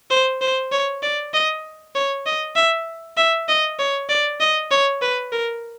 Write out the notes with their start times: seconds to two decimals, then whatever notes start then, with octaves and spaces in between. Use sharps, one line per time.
0.11 C5
0.41 C5
0.72 C#5
1.03 D5
1.33 D#5
1.95 C#5
2.26 D#5
2.56 E5
3.17 E5
3.48 D#5
3.79 C#5
4.09 D5
4.40 D#5
4.71 C#5
5.02 B4
5.32 A#4